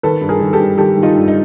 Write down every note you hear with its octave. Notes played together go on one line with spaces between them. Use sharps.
D#3 A4 B4
G2
G#4 A#4
D#3
G4 A4
G2
D#3 G4 A4
D#3
D#4 F4
G2
D#4